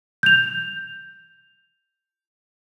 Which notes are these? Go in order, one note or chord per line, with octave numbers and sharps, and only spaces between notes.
G6 F7